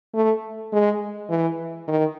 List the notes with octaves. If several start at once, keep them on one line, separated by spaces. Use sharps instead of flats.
A3
G#3
E3
D#3